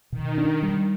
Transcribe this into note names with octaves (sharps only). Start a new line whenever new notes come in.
B2 D#3
D4
G3